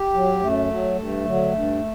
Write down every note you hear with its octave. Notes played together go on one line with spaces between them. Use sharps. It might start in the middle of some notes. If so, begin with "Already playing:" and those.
Already playing: G4
F#3
F#2 A3
F#3
G2
D3 F#3
G2